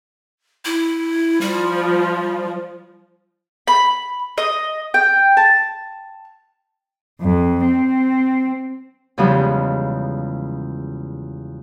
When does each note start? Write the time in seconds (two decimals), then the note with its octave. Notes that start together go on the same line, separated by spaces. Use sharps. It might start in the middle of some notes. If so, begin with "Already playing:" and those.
0.65 E4
1.41 F3 G3
3.68 B5
4.38 D#5
4.94 G5
5.37 A5
7.21 F2
7.67 C4
9.18 E2 C#3 F3 G3 G#3 D#4